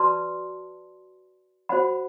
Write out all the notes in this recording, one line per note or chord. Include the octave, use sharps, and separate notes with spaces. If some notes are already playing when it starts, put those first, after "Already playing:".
Already playing: F#4 B4 D5 A5 C6
F#4 C5 F#5 B5